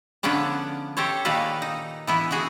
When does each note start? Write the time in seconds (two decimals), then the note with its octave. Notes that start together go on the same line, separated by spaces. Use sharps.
0.23 D3 F3 B3 C#4 D4
0.97 G4 A4 C5 C#5
1.25 A#2 D#3 A#3 A4 B4 F5
1.62 D#4
2.07 E3 B3 E4
2.31 E3 A3 F#4 G#4